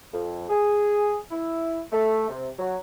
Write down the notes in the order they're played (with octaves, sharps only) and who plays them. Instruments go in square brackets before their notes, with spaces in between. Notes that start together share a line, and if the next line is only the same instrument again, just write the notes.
[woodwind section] F2
G#4
E4
A3
C3
F#3